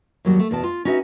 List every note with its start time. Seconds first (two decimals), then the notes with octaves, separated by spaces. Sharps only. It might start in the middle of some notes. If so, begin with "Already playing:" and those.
0.25 D#2 F#3 G3 F#4
0.40 A3
0.51 E2 B2 A5
0.63 F4
0.85 C#4 D#4 F#4 B4 E5